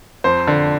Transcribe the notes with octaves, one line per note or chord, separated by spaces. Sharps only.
F2 C5
D3